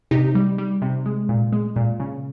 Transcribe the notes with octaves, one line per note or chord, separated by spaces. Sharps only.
C3 D#4 G4
G3
G3
C3
G#3
A#2
G#3
A#2
C#3